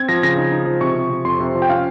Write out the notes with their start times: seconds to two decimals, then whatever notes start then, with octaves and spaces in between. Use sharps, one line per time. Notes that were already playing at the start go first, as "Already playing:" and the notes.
Already playing: C4 G#6
0.09 F3 A#6
0.23 C#3 A#6
0.38 D#4
0.52 D#4
0.66 F3
0.81 C3 C#6
0.96 C3
1.10 C3
1.25 F2 C6
1.40 C3
1.55 F3
1.62 G5
1.69 C#4 F5